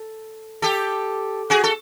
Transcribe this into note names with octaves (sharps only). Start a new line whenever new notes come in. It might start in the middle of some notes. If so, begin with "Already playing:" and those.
Already playing: A4
G4 A4
F#4 G#4
A4